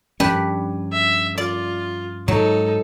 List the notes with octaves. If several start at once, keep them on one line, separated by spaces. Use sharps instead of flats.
G2 F3 C#4 D4 G4 B4
E5
F4 D5
G#2 F#3 D#4 A4